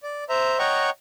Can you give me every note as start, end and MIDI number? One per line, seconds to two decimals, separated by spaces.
0.03 0.24 74
0.29 0.59 72
0.29 0.59 76
0.29 0.59 82
0.59 0.90 73
0.59 0.90 75
0.59 0.90 78
0.59 0.90 79
0.59 0.90 82
0.59 0.90 85